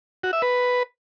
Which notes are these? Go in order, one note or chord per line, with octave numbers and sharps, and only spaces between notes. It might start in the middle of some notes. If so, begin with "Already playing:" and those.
F#4
E5
B4